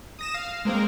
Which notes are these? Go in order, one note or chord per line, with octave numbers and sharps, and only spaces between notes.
D#6 A#6 E7
F5
G#3 A#3 C4 A#4